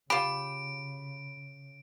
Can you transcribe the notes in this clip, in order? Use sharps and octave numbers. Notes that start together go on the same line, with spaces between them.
C#3 F4 G4 B5 D7